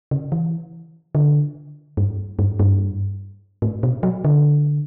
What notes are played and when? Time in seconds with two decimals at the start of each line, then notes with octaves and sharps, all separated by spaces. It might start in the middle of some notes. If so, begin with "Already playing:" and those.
0.11 C#3
0.32 E3
1.15 D3
1.97 G2
2.39 G2
2.60 G2
3.62 A2
3.83 B2
4.03 F#3
4.25 D3